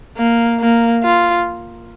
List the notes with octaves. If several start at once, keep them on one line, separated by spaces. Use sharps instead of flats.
A#3
A#3
F4